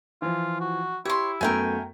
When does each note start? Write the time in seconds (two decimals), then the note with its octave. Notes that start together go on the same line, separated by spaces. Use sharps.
0.22 E3 F3 F4
0.61 F#4
1.05 E4 G4 C#5 C6
1.41 F#2 A3 B3 A#4 G5 G#5